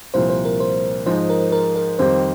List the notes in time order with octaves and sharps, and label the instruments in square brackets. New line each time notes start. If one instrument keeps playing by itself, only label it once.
[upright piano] C2 A#2 F3 [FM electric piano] C5
[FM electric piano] C5
A#4
C5
[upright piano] G#2 F3 G#3 D#4 [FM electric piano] C5
[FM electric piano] A#4
A#4
A#4
[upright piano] F2 D#3 G3 C4 G4 [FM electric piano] C5